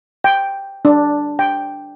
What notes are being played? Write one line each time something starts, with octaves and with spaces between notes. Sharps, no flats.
G5
D4
G5